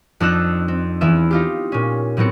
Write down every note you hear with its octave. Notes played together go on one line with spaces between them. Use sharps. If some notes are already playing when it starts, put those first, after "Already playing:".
F2 D4 D#4 E6 F#6 E7
C4
E2 E3 B3 E4 E5
D#4 F4 G4
A#2 C#4
A2 F#3 B3 C4 C#7